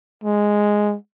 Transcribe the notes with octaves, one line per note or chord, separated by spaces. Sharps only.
G#3